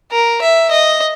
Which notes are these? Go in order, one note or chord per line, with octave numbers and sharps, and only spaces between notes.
A#4
E5
D#5